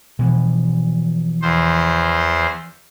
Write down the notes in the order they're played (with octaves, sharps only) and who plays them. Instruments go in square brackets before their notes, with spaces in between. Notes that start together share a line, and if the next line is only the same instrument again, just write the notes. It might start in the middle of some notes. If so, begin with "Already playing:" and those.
[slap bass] B2 E3 F3
[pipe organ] E2 C5